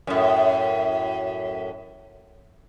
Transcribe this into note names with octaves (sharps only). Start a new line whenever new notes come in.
F#2 A2